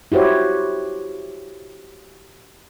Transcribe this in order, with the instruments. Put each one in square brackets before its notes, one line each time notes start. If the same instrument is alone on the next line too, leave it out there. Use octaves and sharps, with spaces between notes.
[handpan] E4 F#4 G4 C5 C#5